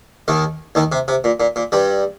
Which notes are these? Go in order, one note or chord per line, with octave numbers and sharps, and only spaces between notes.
D#2 D#3
D#2 D#3
C3
C3
A#2
A#2
A#2
G2 G3